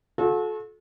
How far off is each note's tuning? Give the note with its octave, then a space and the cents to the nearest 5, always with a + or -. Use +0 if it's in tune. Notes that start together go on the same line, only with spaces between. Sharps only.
F#4 -45 A4 -30